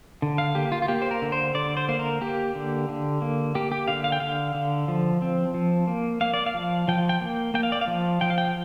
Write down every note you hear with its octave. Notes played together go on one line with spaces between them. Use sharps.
D3
F5
A#3 G4
F4
F4
A#3 G4
C5
A#4
D3
C5
D3 D5
C5
A#3 C5
A#4
A#3 G4
D3
D3
A#3
A#3 G4
G4
D3 F5
F5
G5
D3 F5
D3
F3
C4
F3
A#3
A#3 F5
D5
F5
F3
F3 G5
G5
A#3
A#3 G5
F5
D5
F5
F3
F3 G5
F5
G5